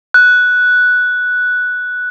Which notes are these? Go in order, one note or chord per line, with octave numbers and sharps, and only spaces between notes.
F#6